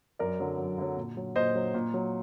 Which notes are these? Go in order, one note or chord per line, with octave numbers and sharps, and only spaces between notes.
F#2 A#4 D5
D3 F#3
F#2
D3 F#3
A#2
F#3
A#2 C5 D#5
F#3
A#2
F#3